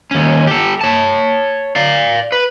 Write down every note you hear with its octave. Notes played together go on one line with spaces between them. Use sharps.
D#2 C#4
G4 A4
C#5 A5
D5 F5
B4